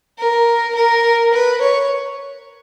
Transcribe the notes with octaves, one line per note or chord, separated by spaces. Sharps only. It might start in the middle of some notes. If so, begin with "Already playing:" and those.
A#4
A#4
B4
C#5